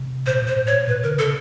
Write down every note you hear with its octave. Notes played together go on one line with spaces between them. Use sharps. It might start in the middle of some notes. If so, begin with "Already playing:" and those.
Already playing: C3
A#2 C5
A#2
C5
A2
C#5
A#2
B2 B4
D3 A#4
C#3 A4